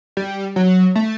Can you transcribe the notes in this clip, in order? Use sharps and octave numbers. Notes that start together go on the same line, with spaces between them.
G3
F#3
A3